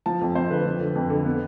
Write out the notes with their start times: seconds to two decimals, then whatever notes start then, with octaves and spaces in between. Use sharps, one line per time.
0.06 F3 A5
0.21 F2
0.35 F2 C5
0.50 D3 B4
0.65 F3
0.80 D3
0.95 F2
1.10 D3
1.25 B3